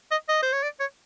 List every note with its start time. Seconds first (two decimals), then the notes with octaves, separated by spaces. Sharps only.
0.11 D#5
0.28 D#5
0.42 C5
0.53 C#5
0.63 D5
0.80 C#5